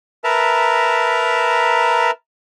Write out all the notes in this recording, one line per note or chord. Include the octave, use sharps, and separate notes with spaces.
A#4 B4 E5 A5 A#5